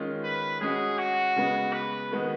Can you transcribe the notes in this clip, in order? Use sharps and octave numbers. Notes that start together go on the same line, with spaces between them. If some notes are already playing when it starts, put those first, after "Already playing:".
Already playing: D#3 G#3 C#4 F4
B4
G#3 C#4 F#4 G#4
F#4
C#3 G#3 B3
B4
D#3 G#3 B3 F#4